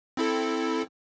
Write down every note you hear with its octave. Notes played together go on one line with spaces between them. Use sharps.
C4 E4 A4